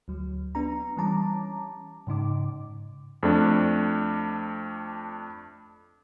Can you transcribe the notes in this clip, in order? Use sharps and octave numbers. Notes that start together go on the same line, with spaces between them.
D2 F#3
B3 D4 A#5
E3 G3 C#4 A5 A#5 D6
G#2 C#3 D#4 D6
F2 A3 D4